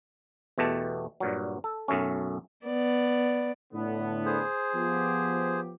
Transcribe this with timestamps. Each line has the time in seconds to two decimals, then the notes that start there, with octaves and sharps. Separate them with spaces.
0.58 E2 B2 A3 G4 A5
1.20 G2 A#2 F#3
1.64 A4
1.88 B1 F#2 A3 C#4
2.67 B3 D5
3.73 A2 D3 B3
4.26 G#4 C5
4.74 F3 B3 G4